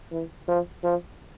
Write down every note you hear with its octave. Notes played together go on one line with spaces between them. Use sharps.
E3
F3
F3